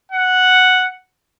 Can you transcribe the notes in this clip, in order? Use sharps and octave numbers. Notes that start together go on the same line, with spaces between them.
F#5